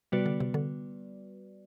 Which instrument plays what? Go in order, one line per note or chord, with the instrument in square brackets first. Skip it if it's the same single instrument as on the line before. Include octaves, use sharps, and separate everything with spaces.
[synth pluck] C3 [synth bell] G3 B3 F#4 B4 D5
[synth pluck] D3
C3
D3